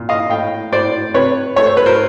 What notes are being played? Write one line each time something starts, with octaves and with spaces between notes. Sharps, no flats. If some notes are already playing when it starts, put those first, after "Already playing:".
Already playing: A#2
D#5 F5
A2 F5 G5
A2 C5 D5
C3 B4 C#5
A3 C#5
C5
B4
A#4 C5